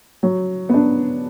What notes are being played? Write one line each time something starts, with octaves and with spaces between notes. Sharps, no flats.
F#3
B3 D4